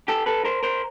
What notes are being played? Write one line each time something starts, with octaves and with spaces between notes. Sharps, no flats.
G4 A4
A4 B4
A#4 C5
A#4 C5